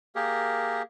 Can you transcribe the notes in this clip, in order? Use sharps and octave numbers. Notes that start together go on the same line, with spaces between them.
A#3 G4 G#4 A#4